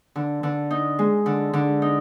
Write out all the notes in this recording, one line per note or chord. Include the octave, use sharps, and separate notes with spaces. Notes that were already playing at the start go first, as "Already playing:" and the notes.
D3
D3
D#4
G#3
D3
D3
D#4